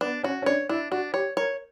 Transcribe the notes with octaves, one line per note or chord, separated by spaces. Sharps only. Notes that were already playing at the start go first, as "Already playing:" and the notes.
B3 D4
C#4 F#4
C#4
D4 C#5
D4 E4
D4 F#4
G4 C#5
A#4 C#5